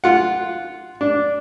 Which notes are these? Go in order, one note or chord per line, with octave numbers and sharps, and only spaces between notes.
F4 F#5
D4